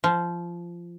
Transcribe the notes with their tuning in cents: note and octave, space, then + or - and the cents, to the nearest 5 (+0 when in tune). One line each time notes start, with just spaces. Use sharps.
F3 -15